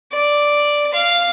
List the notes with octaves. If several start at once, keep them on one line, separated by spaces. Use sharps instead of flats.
D5
F5